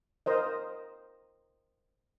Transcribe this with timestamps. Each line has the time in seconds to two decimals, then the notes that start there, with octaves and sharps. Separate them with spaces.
0.26 A#4 C5 D#5